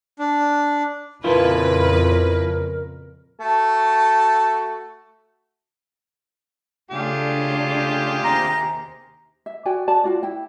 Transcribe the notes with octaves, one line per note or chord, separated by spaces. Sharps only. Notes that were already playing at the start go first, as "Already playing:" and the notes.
D4
F2 A#2 C#3 F3 E4 F4 A#4 B4
A3 F#4 A5
C#3 A3 D4 F4 G4 G#4
D#2 C3 A#5
E5
F#4 D5 G5 G#5
F#4 D5 A5
F4 F#4 D5
E4 G5